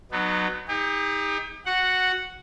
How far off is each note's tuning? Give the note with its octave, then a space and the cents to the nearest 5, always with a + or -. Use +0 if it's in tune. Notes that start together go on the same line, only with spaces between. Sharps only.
F#3 +0 B3 +5 D#4 -35
D#4 +25 G4 +45
F#4 -5 F#5 +0